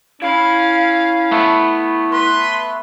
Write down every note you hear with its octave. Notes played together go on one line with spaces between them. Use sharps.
C#4 E4 F5 B5
A3 B3
B4 C6